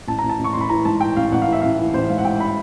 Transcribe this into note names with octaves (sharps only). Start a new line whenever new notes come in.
A1 A5
A#5
A1
A5
A1
C#6
A1 C6
B5
E3 A#5
G#2 A5
E3 G5
A1 F5
A1 F#5
F5
E3
E5
A1 F5
E3
A1 C5
G#2 F5
F#5
G#2 G5
B5